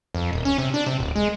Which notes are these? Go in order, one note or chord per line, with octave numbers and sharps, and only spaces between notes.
F2
D#1
C#4
C3
D4
C3
D1
G#3